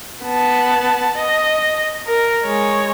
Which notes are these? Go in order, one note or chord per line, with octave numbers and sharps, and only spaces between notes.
B3 A5
D#5
A#4
G#3 C#5